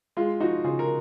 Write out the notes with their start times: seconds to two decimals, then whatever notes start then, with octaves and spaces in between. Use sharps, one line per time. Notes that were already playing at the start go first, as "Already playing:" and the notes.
0.17 G#3 F4
0.40 F3 D#4 F#4
0.64 C#3 F4 G#4
0.79 A#4